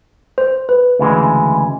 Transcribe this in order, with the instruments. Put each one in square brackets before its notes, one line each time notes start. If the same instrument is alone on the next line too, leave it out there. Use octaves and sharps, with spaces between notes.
[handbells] C5
B4
[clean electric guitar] D2 C#3 E3 G#3